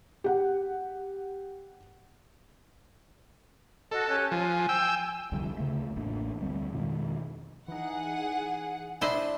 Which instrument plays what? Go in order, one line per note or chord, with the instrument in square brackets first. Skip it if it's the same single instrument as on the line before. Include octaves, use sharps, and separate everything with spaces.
[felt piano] G4 F#5
[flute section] F#4 D#5 [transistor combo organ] A4
[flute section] C#4 G4 F#6
[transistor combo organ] F3 [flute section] G#5
[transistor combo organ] G5 E6
[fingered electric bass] C2 F2 D3 G3
D2 C#3 A3
A1 F2 A#3 D4
D2 E3 G3 C4
F2 B2 D#3 G#3
[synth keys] E3 D#4 [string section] G#4 F#5
[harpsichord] D4 [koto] E4 C5 D#5